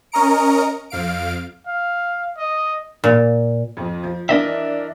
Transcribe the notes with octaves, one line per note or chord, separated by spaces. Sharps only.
C#4 A#4 D#5 A#5 C#7 D7
F2 F5 D7
F5
D#5
A#2
F2 F3
F3
E3 D4 A#4 D#5 E5